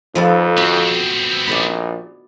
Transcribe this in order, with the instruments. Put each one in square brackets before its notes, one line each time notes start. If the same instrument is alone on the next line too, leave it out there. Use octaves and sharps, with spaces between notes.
[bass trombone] F2 [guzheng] F3 B3 A4
[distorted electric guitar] B3 C4 [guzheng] F#4
[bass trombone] A#1 [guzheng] D5 D#5 B5